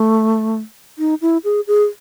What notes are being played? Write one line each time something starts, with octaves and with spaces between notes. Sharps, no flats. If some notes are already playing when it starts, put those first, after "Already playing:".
Already playing: A3
D#4
E4
G#4
G#4